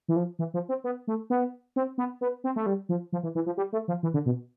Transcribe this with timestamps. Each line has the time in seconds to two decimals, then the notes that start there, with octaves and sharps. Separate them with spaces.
0.08 E3
0.16 F3
0.39 E3
0.54 F3
0.69 C4
0.84 B3
1.08 A3
1.30 B3
1.76 C4
1.98 B3
2.21 B3
2.44 C4
2.56 A3
2.66 G3
2.89 F3
3.13 F3
3.23 E3
3.35 E3
3.46 F3
3.57 G3
3.73 A3
3.88 F3
4.03 E3
4.14 D3
4.26 B2